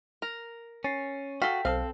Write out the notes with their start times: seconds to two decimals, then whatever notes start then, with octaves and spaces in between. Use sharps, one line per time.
0.22 A#4 F7
0.84 C#4 A6 C7
1.42 F#4 A4 F5 G5 B6
1.65 B1 C4 G#4 A4 C5 F5